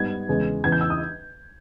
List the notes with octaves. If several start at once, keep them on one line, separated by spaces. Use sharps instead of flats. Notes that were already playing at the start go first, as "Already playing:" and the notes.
Already playing: G#2 G3 B3 G#6
E2 C#3 G#3
E2 C#3 E3 G#6
G6
E6
D#6